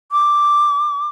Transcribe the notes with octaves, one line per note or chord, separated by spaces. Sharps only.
D6